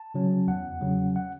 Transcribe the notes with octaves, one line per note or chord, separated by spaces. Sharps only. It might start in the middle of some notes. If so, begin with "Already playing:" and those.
Already playing: A5
C#3 F#3 C#4
E2 F#5
C#3 F#3 C#4
F#5